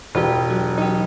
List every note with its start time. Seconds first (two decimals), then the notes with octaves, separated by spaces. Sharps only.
0.15 E1 F4 G4
0.50 F#3
0.78 D#4 G4